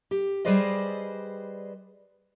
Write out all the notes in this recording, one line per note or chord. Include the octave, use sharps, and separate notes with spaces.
G4
G3 G#4 B4 C5 D5 D#5